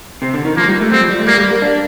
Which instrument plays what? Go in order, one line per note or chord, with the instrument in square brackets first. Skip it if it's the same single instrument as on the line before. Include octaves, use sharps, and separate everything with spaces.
[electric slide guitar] C3
D3
D#3
[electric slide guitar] F3 [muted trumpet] A#3
[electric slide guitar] G3
A3
[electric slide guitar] G3 [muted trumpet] C4
[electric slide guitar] F3
G3
A3
[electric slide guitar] G3 [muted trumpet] A#3
[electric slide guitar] G3
A#3
D4